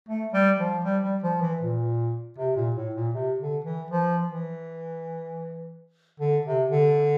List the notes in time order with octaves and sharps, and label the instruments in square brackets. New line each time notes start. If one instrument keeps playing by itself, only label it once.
[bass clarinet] A3
G3
F3
G3
G3
F3
E3
A#2
C3
A#2
A2
A#2
C3
D3
E3
F3
E3
D3
C3
D3